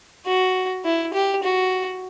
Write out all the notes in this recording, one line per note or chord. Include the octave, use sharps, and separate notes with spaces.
F#4
E4
G4
F#4